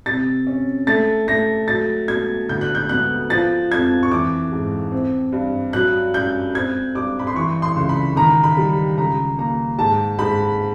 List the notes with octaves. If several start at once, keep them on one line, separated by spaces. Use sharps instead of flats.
C3 A6
C#4
A3 A6
A3 A#6
F#3 A6
B2 G#6
D2 G6
F#6
G6
B3 F#6
F3 A6
F2 G#6
C#6
E3 D6
G#2
C4
G2
F#3 F#6
F#2 G6
C4 G#6
G2 D6
B5
C6
E3 C#6
C6
C#2
B5
D#3 A#5
B5
G3
C#2 A#5
A#3 A#5
G#2 A5
G#2 B5